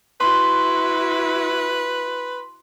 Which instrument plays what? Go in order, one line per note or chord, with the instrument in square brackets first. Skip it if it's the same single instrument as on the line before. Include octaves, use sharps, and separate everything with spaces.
[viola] E4 F#4 [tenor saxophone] B4 [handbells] C6